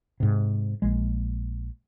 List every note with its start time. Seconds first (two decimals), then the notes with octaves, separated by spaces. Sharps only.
0.20 G#2 C3
0.82 A#1 G#3